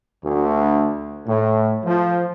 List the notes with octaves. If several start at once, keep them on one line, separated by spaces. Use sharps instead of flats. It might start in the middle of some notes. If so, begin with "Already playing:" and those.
D2
A2
F3